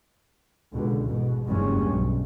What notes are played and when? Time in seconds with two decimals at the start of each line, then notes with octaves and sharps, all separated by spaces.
0.73 C#2 B2 D3
1.05 A1 G#2 B2
1.46 F#1 E2 G2 G3 G#3 C#4
1.90 B1